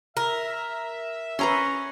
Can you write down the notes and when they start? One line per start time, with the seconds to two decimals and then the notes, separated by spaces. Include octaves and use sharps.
0.17 A#4 E5
1.39 C#4 B4 A#5 C6